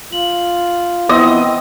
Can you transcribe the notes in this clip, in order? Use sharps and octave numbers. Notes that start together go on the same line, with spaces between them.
F4 F#7
E3 F3 B3 C4 E4 D#5 C6 E6